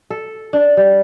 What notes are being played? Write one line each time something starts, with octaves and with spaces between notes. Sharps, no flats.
A4
D4
G3